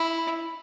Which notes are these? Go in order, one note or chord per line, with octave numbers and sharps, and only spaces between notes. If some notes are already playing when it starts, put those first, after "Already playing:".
Already playing: E4